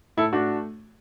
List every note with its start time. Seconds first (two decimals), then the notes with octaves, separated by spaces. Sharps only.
0.17 A2 E4 A4
0.33 A3 D4 F#4